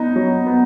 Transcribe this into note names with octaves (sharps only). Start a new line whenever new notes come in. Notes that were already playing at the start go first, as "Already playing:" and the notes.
Already playing: B3 D#4
F#3
B3